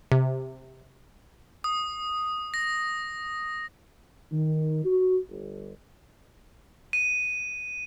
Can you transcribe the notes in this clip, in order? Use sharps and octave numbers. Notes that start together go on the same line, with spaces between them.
C3
D#6
A#6
D#3
F#4
G1
D#7